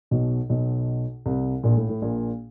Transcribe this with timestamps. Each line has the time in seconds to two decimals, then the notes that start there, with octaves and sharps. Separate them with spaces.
0.11 B1 B2
0.49 B1 B2
1.26 C2 C3
1.63 A#1 A#2
1.77 A2
1.89 A2
2.02 A#1 A#2